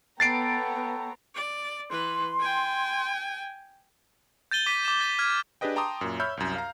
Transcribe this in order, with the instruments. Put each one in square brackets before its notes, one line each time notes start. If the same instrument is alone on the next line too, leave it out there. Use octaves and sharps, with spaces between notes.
[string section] B3 A#5 [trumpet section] A4 C#5 G5 [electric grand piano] A6 C7 D7
[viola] D5
[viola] E3 B4 [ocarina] C6
[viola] G5 G#5
[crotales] G6 A6 D#7 G7
D6 B6 D#7
D6 E7
A6 G7
F6 G#6
[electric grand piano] D4 G4 G#4 B4 D#5 G5
G5 A5 A#5 C6 D6 D#6
F#2 A#2
C#5 E5 B5 E6 F6 G6
C2 F#2
F5 A#5